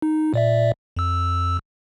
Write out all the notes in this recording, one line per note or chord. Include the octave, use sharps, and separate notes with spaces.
D#4
A#2 D5 E5
F2 E6